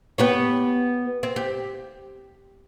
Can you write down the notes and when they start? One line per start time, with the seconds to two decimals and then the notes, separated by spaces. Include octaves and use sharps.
0.18 B3 G4 C#5
1.23 C4
1.36 G4